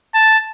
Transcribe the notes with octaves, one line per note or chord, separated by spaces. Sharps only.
A5